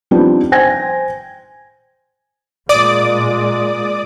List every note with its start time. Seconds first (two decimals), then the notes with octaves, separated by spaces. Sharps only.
0.11 F3 G3 B3 C4 D4 D#4
0.52 C5 G5 G#5 G#6 A#6
2.69 A#2 G#3 D5 D6 D#6